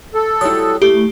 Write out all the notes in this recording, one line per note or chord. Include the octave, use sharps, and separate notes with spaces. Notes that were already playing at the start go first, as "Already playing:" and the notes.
A4
F#3 G3 E4 D#6
A3 E4 G4